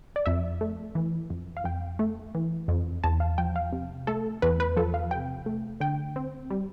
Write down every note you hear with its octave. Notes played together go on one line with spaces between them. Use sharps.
D5
F2 E5
A3
E3
F2
F5
F2 G5
A3
E3
F2
E2 A5
F5
F3 G5
F5
C3
A3 A4
E2 B4
B4
F3 A4
F5
C3 G5
A3
D3 G5
C4
G3